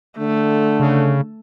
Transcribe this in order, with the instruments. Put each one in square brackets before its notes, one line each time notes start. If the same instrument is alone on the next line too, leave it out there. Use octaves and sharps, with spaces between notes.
[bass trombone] D3 [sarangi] A3
[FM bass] C#3